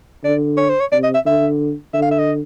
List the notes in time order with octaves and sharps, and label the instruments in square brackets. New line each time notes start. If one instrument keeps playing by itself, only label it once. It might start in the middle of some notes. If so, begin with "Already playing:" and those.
[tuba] D3 [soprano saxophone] D5
[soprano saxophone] C#5
C5
C#5
[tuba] C3 [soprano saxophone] D5
[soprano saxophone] D#5
E5
[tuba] D3 [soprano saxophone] E5
[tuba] D3 [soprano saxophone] E5
[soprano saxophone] F5
E5
D#5